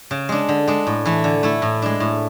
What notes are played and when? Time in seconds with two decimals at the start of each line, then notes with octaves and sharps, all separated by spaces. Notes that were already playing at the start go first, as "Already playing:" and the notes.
0.11 C#3
0.29 G#3 D4
0.49 D3
0.67 G#3 D4
0.87 A2
1.05 E3 A3 E4
1.24 D3
1.43 A3 E4
1.62 A2
1.82 G#3 D4
2.00 A2